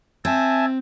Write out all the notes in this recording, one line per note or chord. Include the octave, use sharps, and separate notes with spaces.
C4 E5 G#5 A5